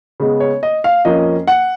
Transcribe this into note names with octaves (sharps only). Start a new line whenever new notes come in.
C#3 G#3 B3
C#5
D#5
F5
F2 F3 A#3 C#4 D#5
F#5